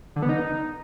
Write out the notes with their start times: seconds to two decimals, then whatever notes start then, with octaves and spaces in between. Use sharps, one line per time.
0.16 D3
0.22 B3
0.29 D#4